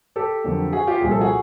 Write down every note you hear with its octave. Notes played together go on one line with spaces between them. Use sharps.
G4 A4
F2 D3 F#3 A#3
F#4 G#4
F4 G4
C2 A#2 F3 G#4
A4
F#4 G#4